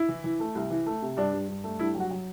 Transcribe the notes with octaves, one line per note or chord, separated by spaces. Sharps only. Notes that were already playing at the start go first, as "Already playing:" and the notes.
Already playing: E4
E3
E3
A3
C2
E3
A3
C3
G2 D4
G2
G2
A3
G2 E4
F#3
F#4
F#3